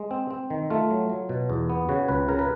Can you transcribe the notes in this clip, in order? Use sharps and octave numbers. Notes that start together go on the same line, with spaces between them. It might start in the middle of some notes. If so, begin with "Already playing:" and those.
Already playing: G#3
C4
C4
D#3
A3 F4
F#3
F#3
B2
E2
B3
C#3 F#4
C#2 B4
C#3 A#4
B4